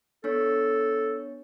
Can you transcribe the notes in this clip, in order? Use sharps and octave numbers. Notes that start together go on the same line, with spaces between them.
B3 D4 A4 C#5